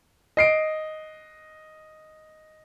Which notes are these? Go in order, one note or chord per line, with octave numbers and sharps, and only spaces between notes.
D#5 C7 D7